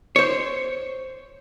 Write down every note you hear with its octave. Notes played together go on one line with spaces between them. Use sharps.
C5 C#5